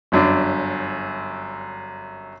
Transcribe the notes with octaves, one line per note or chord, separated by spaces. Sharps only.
G1 F#2 D4